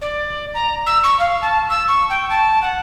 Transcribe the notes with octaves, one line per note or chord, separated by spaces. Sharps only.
D5
A#5
E6
C#6
F5
A5
E6
C#6
G5
A5
F#5